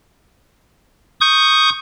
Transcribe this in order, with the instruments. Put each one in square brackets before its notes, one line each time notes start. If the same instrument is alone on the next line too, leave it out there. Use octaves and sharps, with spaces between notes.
[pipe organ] C#6 D#6 G6